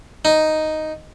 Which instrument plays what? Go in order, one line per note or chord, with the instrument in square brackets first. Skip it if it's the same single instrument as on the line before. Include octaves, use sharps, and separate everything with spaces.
[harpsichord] D#4